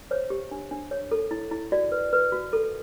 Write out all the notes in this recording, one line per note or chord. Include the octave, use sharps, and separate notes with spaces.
C5 C#5
G4
D4
D4
C#5
A4
E4
E4
F#4 D5
B4
B4
F#4
A4